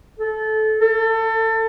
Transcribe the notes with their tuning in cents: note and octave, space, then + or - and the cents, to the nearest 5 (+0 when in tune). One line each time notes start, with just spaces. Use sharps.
A4 -20
A4 +25